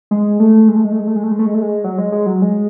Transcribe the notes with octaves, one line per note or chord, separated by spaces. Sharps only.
G#3
A3
G#3
A3
G#3
A3
G#3
A3
G#3
A3
G#3
A3
G#3
A3
G#3
F#3
G#3
G#3
F#3
G#3